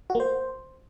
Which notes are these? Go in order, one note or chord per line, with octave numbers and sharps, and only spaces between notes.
F#4
A#3
C5